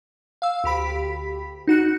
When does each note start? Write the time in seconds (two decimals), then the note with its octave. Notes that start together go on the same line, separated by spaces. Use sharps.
0.42 F5 E6
0.64 D2 G4 B5 B6
1.68 D#4 F#4 F#6 C#7